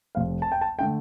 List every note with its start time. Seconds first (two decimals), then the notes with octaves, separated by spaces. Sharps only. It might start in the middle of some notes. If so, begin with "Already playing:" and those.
0.15 F1 F2 F3 C4 F5
0.42 A5
0.52 G5
0.61 A5
0.79 D3 A3 G5